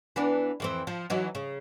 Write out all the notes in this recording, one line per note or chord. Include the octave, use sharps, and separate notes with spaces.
E3 B3 D4
F2 E3 C4
F3
E3 F#3 D#4
C#3